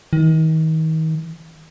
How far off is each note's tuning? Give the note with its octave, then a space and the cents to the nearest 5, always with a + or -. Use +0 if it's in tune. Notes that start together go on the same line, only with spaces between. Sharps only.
D#3 +35